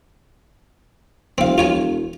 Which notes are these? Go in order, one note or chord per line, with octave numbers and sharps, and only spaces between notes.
E1 C4 F5
F4 C#5 G#5